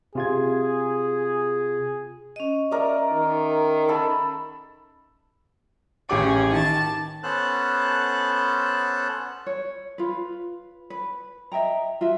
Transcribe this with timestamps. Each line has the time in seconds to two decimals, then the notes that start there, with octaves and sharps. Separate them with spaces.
0.15 C3 F4 G#4 G#6
2.36 C#4 D#5
2.71 A#4 D5 E5
3.12 D#3
3.88 A4 B5
6.09 A1 C#4 G4 G#4 D6
6.52 D#3 A5
7.23 B3 C#4 A4 C5 A5 F#6
9.46 C#5
9.98 F4 B4
10.90 B4
11.52 D#5 E5 G5 A#5
12.01 F4 F#4 E5